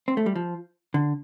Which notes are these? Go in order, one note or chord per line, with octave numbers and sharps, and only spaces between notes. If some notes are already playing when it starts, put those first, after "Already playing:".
C4
A3
G3
F3
D3